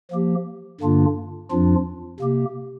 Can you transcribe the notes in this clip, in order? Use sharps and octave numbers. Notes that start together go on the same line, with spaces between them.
F3 A#3 G4
G2 D3 A#3 D4 F4
F2 F3 D4 F4
C3 A#3 G4